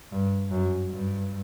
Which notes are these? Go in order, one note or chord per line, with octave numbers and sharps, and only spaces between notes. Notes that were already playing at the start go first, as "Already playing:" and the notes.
G2
F#2
G2